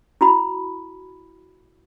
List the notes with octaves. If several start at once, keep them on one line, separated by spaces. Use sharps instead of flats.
E4 F#4 B5